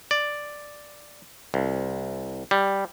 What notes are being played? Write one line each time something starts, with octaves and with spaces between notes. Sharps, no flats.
D5
C2
G3